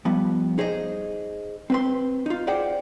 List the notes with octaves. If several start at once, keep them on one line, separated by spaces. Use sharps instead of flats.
F3 G3 B3
D#4 G#4 C5 D5 D#5
C4 B4 C6
D#4 F4
F4 G#4 C5 D5 F#5 G5